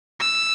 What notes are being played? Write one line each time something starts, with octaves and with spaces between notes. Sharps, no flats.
E6